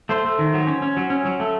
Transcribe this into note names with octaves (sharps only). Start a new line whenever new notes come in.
A3 C5
A3
D#3
F#3
C#4
C#4
F#3
C#4
F#3
A3